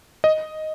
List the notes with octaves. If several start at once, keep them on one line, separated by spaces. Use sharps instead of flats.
D#5